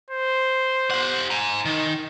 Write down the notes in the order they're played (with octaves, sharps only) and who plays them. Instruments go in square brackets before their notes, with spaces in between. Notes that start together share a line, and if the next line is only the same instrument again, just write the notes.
[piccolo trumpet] C5
[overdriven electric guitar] G4 F#5
G#5 A#5
D#3